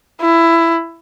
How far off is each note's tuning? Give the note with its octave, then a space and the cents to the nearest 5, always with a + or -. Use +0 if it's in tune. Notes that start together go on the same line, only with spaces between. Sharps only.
E4 +15